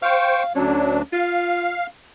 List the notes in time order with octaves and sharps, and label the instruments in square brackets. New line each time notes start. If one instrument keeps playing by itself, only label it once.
[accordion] C5 G5 C#6 [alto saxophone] F5
[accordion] D2 F#3 D4 [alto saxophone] C#4
[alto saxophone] F4 [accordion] F5